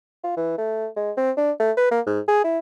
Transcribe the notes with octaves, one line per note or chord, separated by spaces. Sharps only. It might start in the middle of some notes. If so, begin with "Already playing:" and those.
F4
E3
A3
G#3
C4
D4
A3
B4
A#3
G#2
G#4
E4